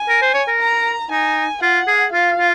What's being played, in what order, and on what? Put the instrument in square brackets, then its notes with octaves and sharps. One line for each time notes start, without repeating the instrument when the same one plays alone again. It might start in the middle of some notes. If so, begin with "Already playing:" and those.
Already playing: [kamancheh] G#5
[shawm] A#4
C5
C#5
A#4
[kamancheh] A#5
[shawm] D#4 [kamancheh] G#5
[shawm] F4 [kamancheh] F#5
[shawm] G#4
[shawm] F4 [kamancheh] F5
[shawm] F4